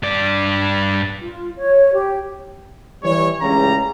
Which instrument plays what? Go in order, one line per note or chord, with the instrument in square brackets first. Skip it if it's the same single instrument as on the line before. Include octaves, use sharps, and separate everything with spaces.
[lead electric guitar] G2 D5
[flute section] F4
C#5
G4
[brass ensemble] E3 G3 E4 C#5
C#2 A2 C#3 G3 A#5